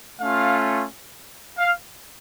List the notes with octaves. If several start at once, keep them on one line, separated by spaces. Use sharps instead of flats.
A3 C#4 F4 F5
F5